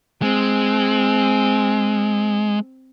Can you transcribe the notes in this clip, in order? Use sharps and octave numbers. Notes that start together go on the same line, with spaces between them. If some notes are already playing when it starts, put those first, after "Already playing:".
G#3 C4